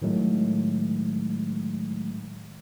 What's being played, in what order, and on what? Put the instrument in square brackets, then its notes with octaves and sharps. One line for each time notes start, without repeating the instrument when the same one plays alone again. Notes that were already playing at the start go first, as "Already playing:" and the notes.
[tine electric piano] A2 D#3 F#3 G#3 A3